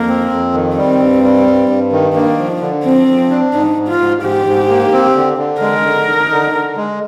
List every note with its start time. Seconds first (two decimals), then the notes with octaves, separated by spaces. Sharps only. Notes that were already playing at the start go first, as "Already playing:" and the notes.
Already playing: F2 A#3
0.08 C4
0.31 F2
0.54 D#3
0.77 G3 C4
1.00 G2
1.24 G3
1.47 G2
1.69 G2
1.92 D#3
2.15 A#3 D4
2.38 F3
2.61 D3
2.84 F3 C4
3.08 F3
3.30 D4
3.54 G#2 D#4
3.77 G#2
3.89 F4
4.00 G#2
4.23 G#2 G4
4.46 G#2
4.69 A#3
4.92 C4
5.15 D3
5.38 D3
5.61 G#3 A#4
5.84 D3
6.07 D#4
6.30 D3
6.54 D3
6.77 G#3